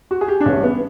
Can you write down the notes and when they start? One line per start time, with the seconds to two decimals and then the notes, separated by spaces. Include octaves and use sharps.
0.11 F#4
0.21 G#4
0.28 G4
0.41 D4
0.46 A1 G#2 E3 G3 C#4
0.63 B3